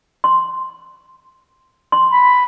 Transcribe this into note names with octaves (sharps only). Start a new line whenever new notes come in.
C6
C6
B5